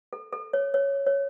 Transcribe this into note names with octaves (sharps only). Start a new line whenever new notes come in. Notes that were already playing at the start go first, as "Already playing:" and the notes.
A4
A4
C#5
C#5
C#5